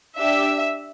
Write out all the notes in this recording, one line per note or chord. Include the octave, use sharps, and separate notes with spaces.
D4 G4 E5